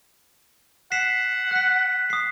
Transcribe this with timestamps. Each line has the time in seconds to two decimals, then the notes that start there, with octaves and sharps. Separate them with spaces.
0.92 F#5 B6 C7 E7
1.51 F#6 B6
2.10 D#6 C7